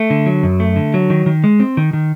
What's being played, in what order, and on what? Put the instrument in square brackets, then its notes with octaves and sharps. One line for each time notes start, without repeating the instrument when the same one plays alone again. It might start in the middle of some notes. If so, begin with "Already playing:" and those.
Already playing: [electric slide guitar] A3
D3
F#3
F#2
A3
D3
F#3
D#3
D#3
G#3
C4
D#3
D#3